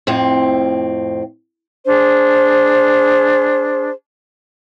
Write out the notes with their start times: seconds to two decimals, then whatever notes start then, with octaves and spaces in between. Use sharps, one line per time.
0.07 F2 A2 C4
1.86 D4 G#4 C5